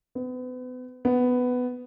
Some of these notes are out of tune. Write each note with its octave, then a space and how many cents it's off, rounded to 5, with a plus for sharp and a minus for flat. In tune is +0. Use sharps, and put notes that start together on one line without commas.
B3 +35
B3 +10